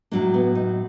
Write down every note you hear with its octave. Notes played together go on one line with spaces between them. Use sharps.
A2 F#3 A#3 D4
B3
D#4